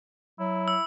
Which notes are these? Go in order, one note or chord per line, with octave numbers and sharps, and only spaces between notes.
F#3 E4
E6